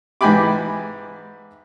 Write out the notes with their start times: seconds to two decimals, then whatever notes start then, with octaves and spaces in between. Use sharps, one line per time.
0.21 G#2 E3 G5 G#5 B5 D6